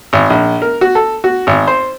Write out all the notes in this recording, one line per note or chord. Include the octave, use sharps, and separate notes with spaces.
G#1
A#1
A#4
F#4
A4
F#4
G#1
C5